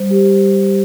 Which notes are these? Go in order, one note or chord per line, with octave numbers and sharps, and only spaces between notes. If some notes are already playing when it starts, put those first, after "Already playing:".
Already playing: G3 C5
G4